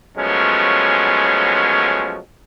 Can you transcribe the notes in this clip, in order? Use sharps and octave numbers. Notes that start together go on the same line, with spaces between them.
F3 F#3 G#3 A3 B3 C#4